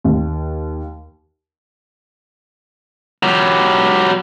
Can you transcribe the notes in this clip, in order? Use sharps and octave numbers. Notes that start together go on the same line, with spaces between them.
D#2
F#3 G4